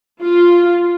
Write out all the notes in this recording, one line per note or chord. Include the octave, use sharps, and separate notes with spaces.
F4